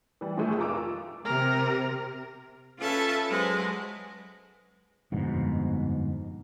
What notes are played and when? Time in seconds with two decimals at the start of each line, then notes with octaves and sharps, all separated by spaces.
0.21 E3 G3
0.37 A#1 D#2 G#2 F3 G#3 A3
0.58 F1 F4 A#4 D6 E6 D7
1.25 C3 A#4
2.79 C#4 F4 A4 B4 E5 A5
3.28 F#3 G#3 B4 C5
5.12 G1 F2 G#2 B2